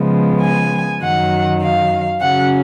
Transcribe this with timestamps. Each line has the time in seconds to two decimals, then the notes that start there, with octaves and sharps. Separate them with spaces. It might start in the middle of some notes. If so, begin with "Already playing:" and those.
Already playing: C#3 F3 G#3 B3
0.41 G#5
1.01 F#2 D#3 F#3 F#5
1.61 F5
2.21 C#3 F#3 C#4 F#5